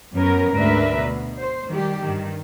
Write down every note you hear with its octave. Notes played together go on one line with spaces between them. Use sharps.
F#2 B3 C#4 A#4
D2 G#2 D4 A#4 B4 E5
B2
C5
D#3 G3 G4
G2 D#3